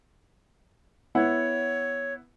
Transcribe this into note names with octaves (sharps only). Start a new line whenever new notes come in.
B3 E4 C#5 F#5